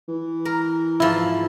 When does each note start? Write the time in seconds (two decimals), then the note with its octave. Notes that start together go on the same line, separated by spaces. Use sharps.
0.08 E3
0.45 A#4
1.00 G#2 F3 E4